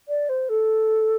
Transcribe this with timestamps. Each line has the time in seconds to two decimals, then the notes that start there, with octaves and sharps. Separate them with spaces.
0.09 D5
0.29 C5
0.49 A4